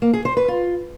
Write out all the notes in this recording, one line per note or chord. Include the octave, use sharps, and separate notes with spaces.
A#3
G#4
C5
B4
F4